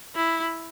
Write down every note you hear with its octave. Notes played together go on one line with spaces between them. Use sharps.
E4